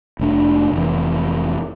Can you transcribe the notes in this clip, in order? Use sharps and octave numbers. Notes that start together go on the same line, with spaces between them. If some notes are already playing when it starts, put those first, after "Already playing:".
F1 A3 D4
F1 E3